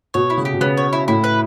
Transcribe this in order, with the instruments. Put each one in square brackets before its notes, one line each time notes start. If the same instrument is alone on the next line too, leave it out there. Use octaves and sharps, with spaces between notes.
[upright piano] B2 [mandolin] C#5
[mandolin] E4
[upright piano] C#3
[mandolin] G4
[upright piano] B2
[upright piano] C#3 [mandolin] B3
[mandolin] C#5
E4
[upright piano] A2 [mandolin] E4
[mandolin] B4